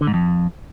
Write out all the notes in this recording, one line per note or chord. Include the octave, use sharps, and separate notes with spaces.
D3
G#2
F2